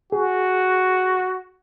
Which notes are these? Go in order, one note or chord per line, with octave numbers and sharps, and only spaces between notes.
F#4 G#4